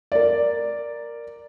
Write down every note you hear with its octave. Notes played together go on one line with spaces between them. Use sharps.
A#4 D5